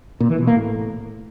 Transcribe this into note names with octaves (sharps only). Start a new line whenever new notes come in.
A#2
E3
B2
A#3
A2